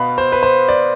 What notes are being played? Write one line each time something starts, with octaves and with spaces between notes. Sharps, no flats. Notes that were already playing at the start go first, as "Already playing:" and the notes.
Already playing: B2 B3 F5 B5
C5
B4
C5
D5